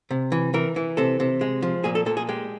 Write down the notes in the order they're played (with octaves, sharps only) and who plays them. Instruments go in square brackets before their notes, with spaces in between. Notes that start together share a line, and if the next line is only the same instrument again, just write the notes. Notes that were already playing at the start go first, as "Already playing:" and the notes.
[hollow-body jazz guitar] C3
E3
E3 A#4
E3
C3 A4
C3
G#3
F3
A#2 G#4
A4
A#2 A4
G#4
G#3 G4